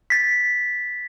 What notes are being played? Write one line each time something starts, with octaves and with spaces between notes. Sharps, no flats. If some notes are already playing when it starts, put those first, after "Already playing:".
A6 B6